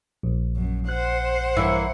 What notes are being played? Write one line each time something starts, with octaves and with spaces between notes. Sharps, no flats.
A#1
F#2
C5 F#5 F#6
G2 E3 A#3 C#5 C#7